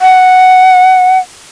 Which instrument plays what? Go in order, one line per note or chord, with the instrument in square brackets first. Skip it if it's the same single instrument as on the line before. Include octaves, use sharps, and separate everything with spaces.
[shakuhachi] F#5